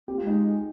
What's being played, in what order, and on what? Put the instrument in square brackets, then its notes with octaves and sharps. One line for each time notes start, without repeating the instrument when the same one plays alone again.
[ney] C4 [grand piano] G4
[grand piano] F4
[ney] G#3
[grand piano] D#4